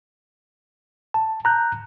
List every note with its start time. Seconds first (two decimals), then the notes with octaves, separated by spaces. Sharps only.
1.14 A5
1.45 A#5 F#6 G6